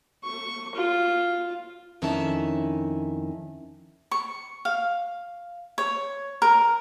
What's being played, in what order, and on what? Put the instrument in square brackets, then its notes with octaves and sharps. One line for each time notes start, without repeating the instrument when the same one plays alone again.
[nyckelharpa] C#6
F4
[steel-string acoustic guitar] F2 D#3 C#4 E4 E5 A5
[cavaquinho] C#6
F5
C#5
A#4